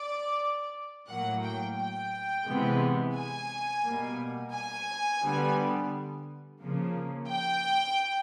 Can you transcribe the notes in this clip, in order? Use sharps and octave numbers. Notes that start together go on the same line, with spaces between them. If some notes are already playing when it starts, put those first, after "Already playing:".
Already playing: D5
A2 F#3 A#3 F#5
G5
G5
C3 E3 G#3 B3
G#5
B2 G3 A#3
G#5
D3 G3 B3
C#3 F3 A#3
G5